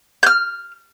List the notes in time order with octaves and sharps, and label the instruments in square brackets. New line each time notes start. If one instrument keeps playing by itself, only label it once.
[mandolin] F6 G6